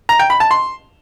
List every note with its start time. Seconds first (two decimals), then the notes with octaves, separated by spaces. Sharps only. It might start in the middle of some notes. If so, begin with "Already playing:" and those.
0.09 A#5
0.19 G5
0.30 B5
0.40 A5
0.51 C6